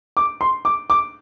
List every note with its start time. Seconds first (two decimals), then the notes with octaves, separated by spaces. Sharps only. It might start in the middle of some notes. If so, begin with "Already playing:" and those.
0.17 D6
0.41 C6
0.65 D6
0.90 D6